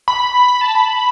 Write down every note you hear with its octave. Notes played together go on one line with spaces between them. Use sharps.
B5
B5
A5
B5